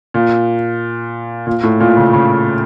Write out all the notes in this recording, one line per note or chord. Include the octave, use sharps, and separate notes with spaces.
A#2
A#2
A2
A#2
C#3
C#3